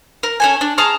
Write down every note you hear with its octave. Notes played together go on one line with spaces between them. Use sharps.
A#4
C#4 A4 G#5
D4
G#4 A5 A#5 F6